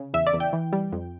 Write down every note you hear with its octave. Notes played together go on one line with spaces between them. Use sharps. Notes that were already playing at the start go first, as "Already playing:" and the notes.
Already playing: C#3
E2 E5
D5
E2
G5
E3
G3
F2